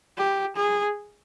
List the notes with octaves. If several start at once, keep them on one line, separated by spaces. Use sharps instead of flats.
G4
G#4